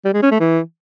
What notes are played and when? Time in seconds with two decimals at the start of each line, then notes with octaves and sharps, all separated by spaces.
0.05 G3
0.13 G#3
0.22 C#4
0.31 A3
0.40 E3